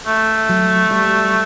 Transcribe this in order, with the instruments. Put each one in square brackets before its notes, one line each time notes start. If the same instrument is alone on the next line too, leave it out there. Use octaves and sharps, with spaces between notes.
[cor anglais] A3
[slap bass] F#3
G3